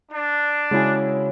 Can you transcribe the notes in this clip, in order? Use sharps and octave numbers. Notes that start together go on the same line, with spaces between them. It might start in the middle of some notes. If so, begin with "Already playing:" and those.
D4
C#3 G#3 E4 F#4 G#5